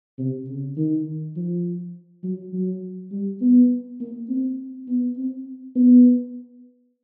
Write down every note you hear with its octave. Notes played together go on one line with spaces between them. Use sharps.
C3
C#3
D#3
F3
F#3
F#3
G3
B3
A#3
C4
B3
C4
B3